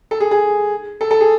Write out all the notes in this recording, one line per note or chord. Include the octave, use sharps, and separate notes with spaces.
A4
G#4
G#4
A4
A4
G#4